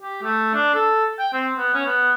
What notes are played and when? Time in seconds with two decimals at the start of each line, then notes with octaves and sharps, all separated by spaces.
0.01 G4
0.23 A3
0.54 D4
0.74 A4
1.19 G5
1.33 C4
1.58 B3
1.74 C#4
1.86 B3